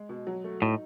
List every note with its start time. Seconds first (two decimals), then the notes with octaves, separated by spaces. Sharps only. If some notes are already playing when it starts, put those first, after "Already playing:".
Already playing: G#3
0.09 B2
0.27 F#3
0.44 A3
0.61 A2 D#4